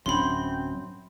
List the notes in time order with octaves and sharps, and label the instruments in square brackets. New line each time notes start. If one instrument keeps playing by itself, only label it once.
[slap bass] D1 D4 [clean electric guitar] F#2 [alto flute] C4 [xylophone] B5 C6